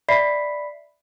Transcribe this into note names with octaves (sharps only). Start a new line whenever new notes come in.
D5 E5 B5 B6 C7